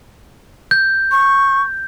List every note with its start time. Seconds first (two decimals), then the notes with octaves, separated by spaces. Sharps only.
0.71 G6
1.11 C#6